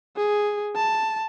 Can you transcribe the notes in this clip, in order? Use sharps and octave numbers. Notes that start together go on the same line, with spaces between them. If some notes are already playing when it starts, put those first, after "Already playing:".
G#4
A5